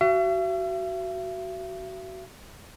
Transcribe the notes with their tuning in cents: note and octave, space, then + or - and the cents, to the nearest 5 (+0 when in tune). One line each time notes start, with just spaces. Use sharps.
F#4 +20 E5 +45